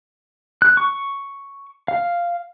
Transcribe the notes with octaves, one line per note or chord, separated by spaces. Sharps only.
F#6
C#6
F5